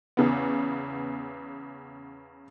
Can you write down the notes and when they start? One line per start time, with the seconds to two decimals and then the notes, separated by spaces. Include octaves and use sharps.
0.17 E2 C#3 B3